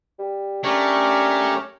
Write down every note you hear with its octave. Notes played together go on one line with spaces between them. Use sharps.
G3
A3 C#4 D4 G4 A#4 C#5